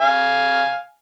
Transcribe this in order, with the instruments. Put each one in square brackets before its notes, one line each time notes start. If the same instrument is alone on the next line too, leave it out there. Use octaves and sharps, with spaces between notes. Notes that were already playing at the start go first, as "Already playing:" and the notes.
[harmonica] F5 G#5